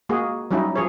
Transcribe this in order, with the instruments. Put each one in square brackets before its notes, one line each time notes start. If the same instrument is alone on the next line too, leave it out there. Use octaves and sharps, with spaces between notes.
[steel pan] G#3 A#3 F#4 G#4
F#3 G3 C#4 D#4 E4
F3 G#4 C#5